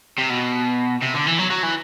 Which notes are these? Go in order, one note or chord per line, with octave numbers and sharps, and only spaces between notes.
C3
B2
C3
D3
E3
F#3
F#3
E3